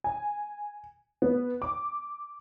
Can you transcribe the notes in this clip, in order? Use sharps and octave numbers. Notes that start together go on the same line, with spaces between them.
G#5
B3
D6